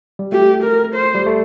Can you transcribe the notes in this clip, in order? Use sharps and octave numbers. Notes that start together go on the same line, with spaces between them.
G3
A3 G4
A#4
C5
G3
A3